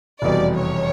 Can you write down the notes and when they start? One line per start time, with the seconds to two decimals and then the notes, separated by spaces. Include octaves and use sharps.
0.22 F1 E2 B2 G3 D5
0.59 C#5